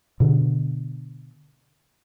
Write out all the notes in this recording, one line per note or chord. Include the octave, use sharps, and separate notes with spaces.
B2 D3